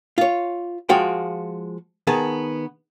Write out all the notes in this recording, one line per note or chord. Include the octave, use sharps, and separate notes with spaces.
F4 C#5
F3 G#3 F#4 F5 G5
D#3 B3 G#4 A5